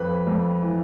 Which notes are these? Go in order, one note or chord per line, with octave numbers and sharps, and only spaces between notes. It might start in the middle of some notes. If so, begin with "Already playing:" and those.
Already playing: F2 B4 B5
F2
E3